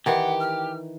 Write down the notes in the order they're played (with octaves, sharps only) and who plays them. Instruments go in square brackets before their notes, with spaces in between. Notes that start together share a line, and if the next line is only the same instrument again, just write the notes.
[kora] D#3 E3 [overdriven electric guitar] G4 [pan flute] F#5
[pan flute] F6